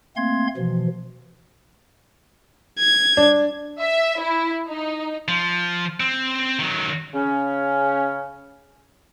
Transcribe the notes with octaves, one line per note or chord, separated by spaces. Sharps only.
A3 A#3 C4 F5 C6 G#6
B2 E3 F3
G#6
D4
E5
E4
D#4
F3
C4
D#3 F#3
C#3 C#4